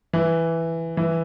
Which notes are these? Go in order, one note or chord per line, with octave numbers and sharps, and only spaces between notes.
E3
E3